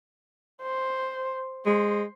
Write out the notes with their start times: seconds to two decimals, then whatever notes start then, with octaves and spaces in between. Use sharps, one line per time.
0.62 C5
1.66 G#3 C5